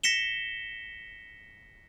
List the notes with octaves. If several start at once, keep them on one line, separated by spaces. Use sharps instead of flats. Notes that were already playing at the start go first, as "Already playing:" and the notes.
A#6 B6 C#7 E7 G7